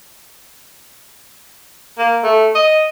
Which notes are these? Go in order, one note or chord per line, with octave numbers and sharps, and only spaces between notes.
A#3
A3
D#5